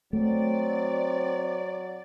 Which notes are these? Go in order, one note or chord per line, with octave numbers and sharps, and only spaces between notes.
F#3 A3 C4 D5